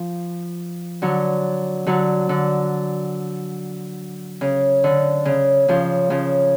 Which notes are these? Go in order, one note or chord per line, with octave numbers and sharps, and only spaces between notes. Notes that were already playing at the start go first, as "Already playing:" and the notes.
Already playing: F3
D3 F#3
D3 F#3
D3
C#3
D3
C#3
C#3 F3
C#3 F3